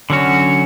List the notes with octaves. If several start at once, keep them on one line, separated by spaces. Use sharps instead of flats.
D3 F#3 C#4 F#4